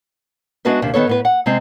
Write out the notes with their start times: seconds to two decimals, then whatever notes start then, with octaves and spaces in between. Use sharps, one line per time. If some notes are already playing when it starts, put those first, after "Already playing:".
0.65 G#3 B3 D4 F#4 B4 E5
0.82 D#2 C3 D4
0.94 D#3 B3 A4 C#5
1.07 A2 B3 B4
1.25 F#5
1.46 C3 G#3 C4